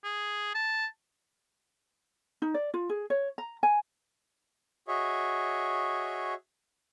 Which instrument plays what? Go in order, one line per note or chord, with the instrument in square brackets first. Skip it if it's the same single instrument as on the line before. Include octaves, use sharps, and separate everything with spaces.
[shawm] G#4
A5
[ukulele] D#4
D5
F4
G#4
C#5
A#5
G#5
[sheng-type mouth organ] F#4 G#4 C#5 D#5 E5